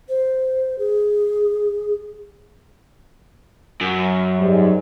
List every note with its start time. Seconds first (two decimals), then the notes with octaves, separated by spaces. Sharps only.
0.09 C5
0.79 G#4
3.81 F#2
4.40 G#2 G3